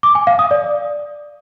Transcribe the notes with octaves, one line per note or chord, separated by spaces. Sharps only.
D6
G#5
F5
D#6
D5